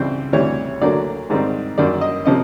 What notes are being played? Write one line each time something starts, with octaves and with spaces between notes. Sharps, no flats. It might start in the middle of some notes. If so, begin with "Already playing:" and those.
Already playing: C#2 C#3 E3 G3 C4 C5
D2 C3 E3 G3 C#5
D2 D3 F#3 A#3 D5
G#2 D#3 G3 C4
F#2 D#3 G3 A#3 D5
D#5
C3 F3 A#3 C#4 D#5